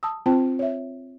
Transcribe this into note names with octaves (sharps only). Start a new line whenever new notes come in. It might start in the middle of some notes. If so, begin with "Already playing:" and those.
A5 D#6 E6
C4 F4 C5 G5 A5
C#5 E5